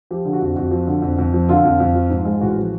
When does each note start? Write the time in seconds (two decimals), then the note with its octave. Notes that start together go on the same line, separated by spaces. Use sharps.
0.11 F3 G4
0.25 D3
0.33 F#4
0.42 F2
0.56 F2 F#4
0.71 F3
0.87 D3
1.02 F2
1.18 F2
1.34 F3
1.49 D3 F4
1.64 F2
1.80 F2
1.95 F3
2.10 G#2
2.25 G#3
2.40 A1 F#4
2.57 F3